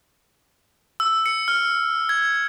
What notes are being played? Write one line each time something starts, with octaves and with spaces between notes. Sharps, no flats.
E6
C#7
F6
G#6